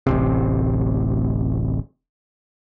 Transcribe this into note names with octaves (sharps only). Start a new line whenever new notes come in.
D1 A1 C3